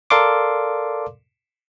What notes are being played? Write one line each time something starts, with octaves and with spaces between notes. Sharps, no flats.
A4 A#4 D5 F5 C6 D6